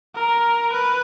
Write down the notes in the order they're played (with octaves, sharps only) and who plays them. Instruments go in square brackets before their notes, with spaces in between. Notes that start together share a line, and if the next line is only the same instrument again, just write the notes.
[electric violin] A#4
B4